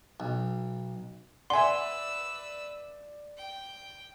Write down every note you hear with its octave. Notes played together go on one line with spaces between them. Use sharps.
B1
B4 D5 E5 F#5 G#5 C6 E6
G5